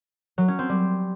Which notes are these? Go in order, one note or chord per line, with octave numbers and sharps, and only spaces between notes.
F#3
C#4
C4
G3